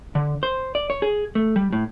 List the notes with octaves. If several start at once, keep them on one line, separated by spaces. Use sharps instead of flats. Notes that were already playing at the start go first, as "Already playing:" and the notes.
D3
C5
D5
C#5
G#4
A3
G3
A2